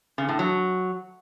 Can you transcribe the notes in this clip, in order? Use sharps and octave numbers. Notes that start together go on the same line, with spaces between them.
C#3
A2
F#3